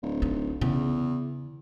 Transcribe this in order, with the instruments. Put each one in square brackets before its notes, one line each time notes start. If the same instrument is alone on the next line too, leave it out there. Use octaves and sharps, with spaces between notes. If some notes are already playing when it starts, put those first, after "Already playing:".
[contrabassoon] D1
[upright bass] D#4
[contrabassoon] E2 [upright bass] C#3